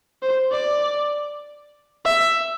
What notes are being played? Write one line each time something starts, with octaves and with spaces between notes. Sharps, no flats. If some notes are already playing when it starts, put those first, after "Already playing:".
C5
D5
E5